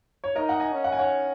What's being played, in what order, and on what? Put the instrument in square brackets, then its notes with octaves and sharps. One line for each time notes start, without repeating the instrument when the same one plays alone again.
[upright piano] C#5
[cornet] D#4 [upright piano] A#4 D#5
[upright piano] F#5
D#5 G#5
[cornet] C#4
[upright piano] F#5
G#5
C#5 F#5